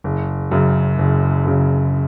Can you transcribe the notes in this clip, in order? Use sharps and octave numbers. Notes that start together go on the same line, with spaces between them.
F#1
F#2 C#3
F#1
F#2 C#3